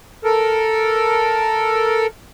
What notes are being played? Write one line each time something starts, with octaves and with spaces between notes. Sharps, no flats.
A4 A#4